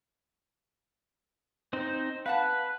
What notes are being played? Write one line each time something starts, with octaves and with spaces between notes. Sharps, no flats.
C4 D#4 C5
B4 F5 F#5 A5